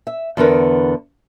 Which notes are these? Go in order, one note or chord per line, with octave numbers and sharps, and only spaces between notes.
E5
E2 D3 B3 A#4 B4